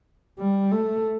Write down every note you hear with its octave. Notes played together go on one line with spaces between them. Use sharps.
G3
A3